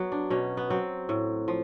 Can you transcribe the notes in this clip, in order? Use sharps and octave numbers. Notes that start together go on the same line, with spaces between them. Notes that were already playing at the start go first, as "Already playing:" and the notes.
Already playing: F#3 B3
D4
B2 C#4
B3
F#3 C4
A2
F3